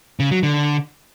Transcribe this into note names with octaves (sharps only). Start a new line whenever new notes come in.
C#3
F#3
D3